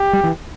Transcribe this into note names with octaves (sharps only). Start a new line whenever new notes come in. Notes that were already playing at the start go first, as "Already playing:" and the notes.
Already playing: G4
G3
E3